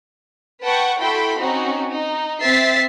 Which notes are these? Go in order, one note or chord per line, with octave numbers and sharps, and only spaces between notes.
B4 F#5 G5 A5 C#6
E4 F#4 A4 G5 B5 C6
C4 C#4 D#4 F#4
D#4
C4 E5 A6 B6 C7